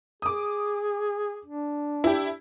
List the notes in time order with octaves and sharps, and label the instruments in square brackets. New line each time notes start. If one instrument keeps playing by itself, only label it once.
[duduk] G#4 [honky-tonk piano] D6 D#6
[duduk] D4
[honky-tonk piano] E4 G4